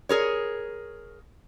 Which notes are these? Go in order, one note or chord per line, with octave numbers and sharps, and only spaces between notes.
G#4 A#4 C#5